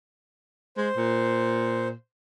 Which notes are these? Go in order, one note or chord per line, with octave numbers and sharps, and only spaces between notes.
G#3 C5
A#2